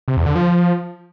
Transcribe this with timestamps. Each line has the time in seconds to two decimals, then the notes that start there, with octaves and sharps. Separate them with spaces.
0.08 C3
0.17 E2
0.26 D3
0.35 F3